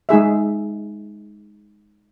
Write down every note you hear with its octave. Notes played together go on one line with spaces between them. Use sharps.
G#3 D#4 G#4 E5